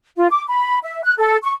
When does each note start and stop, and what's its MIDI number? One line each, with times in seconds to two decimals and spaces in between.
0.17 0.28 65
0.30 0.43 86
0.47 0.78 83
0.83 1.01 76
1.03 1.13 90
1.18 1.37 69
1.43 1.52 85